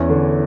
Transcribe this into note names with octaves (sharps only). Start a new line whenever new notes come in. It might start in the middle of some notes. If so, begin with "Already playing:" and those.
Already playing: E2 C#4 E4
D3